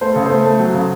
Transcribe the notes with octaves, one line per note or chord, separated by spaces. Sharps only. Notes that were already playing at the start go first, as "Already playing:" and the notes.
A3 C5
C#3 A4
A3 C5
A3
F#3
C#3